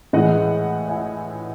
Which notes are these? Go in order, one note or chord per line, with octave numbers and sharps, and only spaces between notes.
A2 E3 G#3 D#5 F#5
E5 G#5